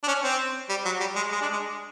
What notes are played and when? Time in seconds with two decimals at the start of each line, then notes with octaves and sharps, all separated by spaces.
0.04 D4
0.07 C#4
0.23 C4
0.69 G3
0.85 F#3
1.00 G3
1.16 G#3
1.32 G#3
1.41 D4
1.52 G#3